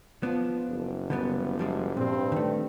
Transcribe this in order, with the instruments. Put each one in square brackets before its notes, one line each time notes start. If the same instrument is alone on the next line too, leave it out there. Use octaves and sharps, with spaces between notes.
[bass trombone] F3 [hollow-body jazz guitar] B3 D4
[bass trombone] F#1
[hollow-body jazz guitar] D3 G3 B3
F3 G3 G#3
[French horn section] G2 [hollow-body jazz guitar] A#2 [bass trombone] C4
[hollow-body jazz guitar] D#3 A3